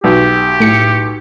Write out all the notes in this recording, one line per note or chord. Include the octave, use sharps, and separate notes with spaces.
B1 G4
A2 C#7